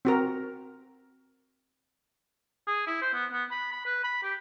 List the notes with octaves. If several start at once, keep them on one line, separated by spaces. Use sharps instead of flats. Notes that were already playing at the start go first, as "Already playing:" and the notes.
C4 F#4 A#4
G#4
E4
C5
B3
B3
B5
B5
B4
B5
G4